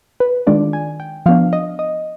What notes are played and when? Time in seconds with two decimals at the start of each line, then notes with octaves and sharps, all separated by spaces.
0.20 B4
0.47 D#3 G#3 D4 F4 D5
0.73 G#5
1.00 G5
1.26 F3 B3 D4 F5
1.53 D#5
1.79 D#5